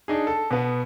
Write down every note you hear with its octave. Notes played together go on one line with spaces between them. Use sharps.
D4 D#4 G#4
A4
B2 B3